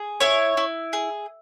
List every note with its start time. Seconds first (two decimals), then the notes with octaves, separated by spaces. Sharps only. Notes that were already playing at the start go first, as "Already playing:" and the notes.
Already playing: G#4
0.20 E4 C#5
0.57 E4
0.93 G#4